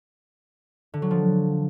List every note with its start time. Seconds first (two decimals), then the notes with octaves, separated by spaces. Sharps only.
0.94 D3
1.02 F#3
1.11 F3